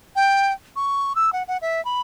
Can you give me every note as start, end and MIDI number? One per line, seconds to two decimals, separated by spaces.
0.16 0.52 79
0.76 1.13 85
1.16 1.30 88
1.33 1.43 78
1.48 1.57 78
1.62 1.83 76
1.85 2.01 83